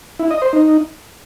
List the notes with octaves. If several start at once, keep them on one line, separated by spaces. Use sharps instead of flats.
E4
D#5
C5
D#4